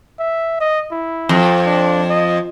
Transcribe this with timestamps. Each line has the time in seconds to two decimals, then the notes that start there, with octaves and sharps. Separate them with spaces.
0.19 E5
0.60 D#5
0.91 E4
1.29 F2
1.66 D4
2.10 D#5